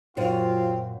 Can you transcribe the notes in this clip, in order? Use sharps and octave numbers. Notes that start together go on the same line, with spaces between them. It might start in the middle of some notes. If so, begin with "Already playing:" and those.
F#2 A#2 F#3 C4 F4 C5 C#5 F5